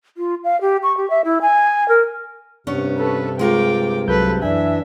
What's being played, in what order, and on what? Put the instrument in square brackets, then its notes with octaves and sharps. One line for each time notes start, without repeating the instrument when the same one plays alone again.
[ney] F4
F5
G4
C#6
G4
E5
E4
G#5
A#4
[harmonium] G2 C3 [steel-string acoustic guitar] B3 C#4 [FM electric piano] D4 C#6
[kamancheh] A4 B4
[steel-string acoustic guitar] G#3 F4 A#4 [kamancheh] G5 D6
[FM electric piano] C2 F#3 G6 [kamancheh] A4 B4
[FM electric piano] F#2 G#5 [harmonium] E3 D4 [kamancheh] E5